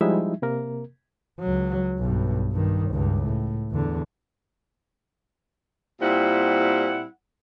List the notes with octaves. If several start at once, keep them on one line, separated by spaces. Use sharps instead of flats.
F3 G3 G#3 D#4 E4 E5
C3 A#3 A#4
C#2 F#3
B1 G2
G2 D#3
C#2 G2
A2
E2 D3
A#2 G3 C4 E4 F#5